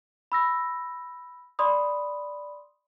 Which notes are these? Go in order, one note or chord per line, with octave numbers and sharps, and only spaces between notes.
B5 E6 A#6
D5 B5 C6 D#6